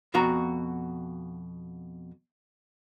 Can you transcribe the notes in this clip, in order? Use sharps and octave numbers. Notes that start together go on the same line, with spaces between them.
F2 B2 F#4 A#5